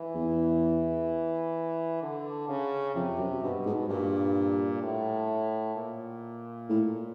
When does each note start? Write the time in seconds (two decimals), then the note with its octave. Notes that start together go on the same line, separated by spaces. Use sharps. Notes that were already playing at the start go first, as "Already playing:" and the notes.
Already playing: E3
0.15 E2
2.02 D3
2.49 C#3
2.95 F2 C3
3.19 F#2
3.43 G2 B2
3.66 G#2
3.89 G2 A#2
4.82 A2
5.76 A#2
6.69 A2